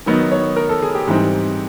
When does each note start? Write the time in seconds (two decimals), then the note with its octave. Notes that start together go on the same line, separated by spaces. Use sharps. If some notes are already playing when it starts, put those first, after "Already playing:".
0.06 D#3 F#3 B3 D#4
0.31 C#5
0.56 A#4
0.69 A4
0.82 G#4
0.95 G4
1.08 G#2 E3 G3 C4 D#4